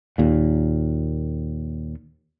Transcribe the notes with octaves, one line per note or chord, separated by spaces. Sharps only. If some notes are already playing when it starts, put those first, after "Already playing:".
D#2 A#2